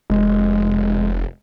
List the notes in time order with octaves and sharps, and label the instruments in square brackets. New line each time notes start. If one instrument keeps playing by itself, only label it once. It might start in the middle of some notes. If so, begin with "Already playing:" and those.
[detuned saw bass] F1 [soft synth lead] G#3